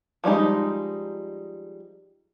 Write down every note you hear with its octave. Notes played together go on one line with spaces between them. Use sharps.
F3 G3 G#3 D#4